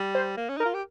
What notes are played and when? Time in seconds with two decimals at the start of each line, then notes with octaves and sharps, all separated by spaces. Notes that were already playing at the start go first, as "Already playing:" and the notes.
Already playing: G3
0.15 C5
0.37 A#3
0.49 C#4
0.57 D#4 A#4
0.65 F4
0.74 G4